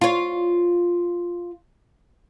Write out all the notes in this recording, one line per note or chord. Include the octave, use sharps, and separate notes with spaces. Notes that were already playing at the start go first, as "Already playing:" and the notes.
F4 C#5